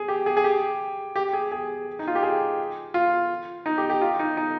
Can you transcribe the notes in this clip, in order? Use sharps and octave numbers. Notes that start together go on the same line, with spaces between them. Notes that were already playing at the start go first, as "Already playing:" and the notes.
Already playing: G#4
G4
G#4
G#4
G4
G4
G#4
G#4
D#4
F4
G4
G#4
F4
D#4
G4
G4
F4
D#4
D#4